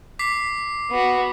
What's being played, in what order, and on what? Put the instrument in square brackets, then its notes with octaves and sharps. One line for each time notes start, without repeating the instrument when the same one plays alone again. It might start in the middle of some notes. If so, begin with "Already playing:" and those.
[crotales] D6 B6 C7
[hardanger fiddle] B3 F#4